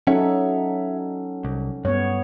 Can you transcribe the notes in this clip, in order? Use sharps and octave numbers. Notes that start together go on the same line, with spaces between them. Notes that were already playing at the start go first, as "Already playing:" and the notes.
F#3 C#4 D#4 A4 C#5 E5 F#5
C2
G2 B3 C#5